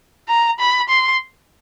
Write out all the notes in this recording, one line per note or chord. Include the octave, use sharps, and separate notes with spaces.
A#5
B5
C6